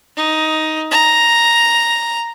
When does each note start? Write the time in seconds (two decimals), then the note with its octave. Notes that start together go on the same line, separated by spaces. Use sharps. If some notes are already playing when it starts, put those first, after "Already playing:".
0.17 D#4
0.91 A#5